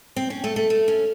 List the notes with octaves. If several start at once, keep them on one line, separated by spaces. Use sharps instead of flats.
C4
C#4
A3
A3
A3
C#4